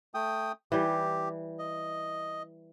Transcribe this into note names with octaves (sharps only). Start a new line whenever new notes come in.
A3 G5 D#6
E3 G3 G4
D#5